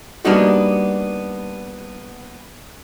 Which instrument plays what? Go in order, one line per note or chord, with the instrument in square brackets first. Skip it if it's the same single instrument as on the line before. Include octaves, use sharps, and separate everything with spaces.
[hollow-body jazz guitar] G3 A#3 B3 D4 D#4 F#4